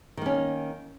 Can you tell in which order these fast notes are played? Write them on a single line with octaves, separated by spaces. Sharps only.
D#3 A#3 C#4